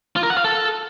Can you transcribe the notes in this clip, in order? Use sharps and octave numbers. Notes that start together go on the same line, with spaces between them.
F4
A#4
F#5
F5
A4